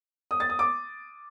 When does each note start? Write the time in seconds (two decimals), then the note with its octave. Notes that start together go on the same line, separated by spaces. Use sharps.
0.31 D#6
0.40 A6
0.50 D#6
0.59 D6